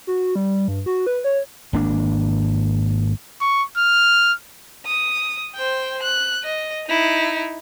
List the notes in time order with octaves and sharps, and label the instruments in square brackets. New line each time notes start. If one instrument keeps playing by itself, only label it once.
[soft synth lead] F#4
G3
G2
F#4
B4
C#5
[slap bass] G#1 A#3 D4
[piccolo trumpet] C#6
F6
[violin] D#6
C5 G5
F#6
D#5
D#4 E4